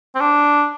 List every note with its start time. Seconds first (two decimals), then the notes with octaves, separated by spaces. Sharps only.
0.15 C4
0.20 D4